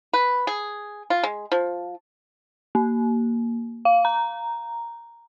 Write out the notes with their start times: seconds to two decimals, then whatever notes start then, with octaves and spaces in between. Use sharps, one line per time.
0.13 B4
0.47 G#4
1.10 F4
1.23 G#3
1.52 F3
2.75 A#3
3.85 F5
4.05 A#5